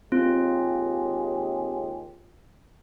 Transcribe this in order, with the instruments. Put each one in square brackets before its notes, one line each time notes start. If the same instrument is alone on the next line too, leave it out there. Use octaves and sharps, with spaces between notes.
[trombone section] D#2 G#3 G4 [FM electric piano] C4 [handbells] F4